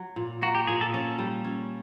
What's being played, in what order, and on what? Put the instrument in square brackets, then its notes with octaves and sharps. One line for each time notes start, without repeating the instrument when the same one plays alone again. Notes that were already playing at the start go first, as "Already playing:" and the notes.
Already playing: [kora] F#3
A#2
[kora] A#3 [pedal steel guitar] F#4
[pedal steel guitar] G4
[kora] A#2 [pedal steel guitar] G#4
[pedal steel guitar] A4
[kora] C#4 [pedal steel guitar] A4
[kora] G3
C#4